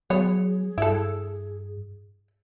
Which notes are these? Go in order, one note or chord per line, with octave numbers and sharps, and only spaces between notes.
F#3 B3 G#4 C#5
G2 E4 A4